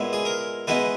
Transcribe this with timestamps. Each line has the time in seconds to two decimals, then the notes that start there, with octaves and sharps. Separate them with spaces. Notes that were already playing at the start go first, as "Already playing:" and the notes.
Already playing: A#2 G#3 B3 E4
0.13 G#4
0.25 A#4
0.67 E3 G#3 B3 D#4 B4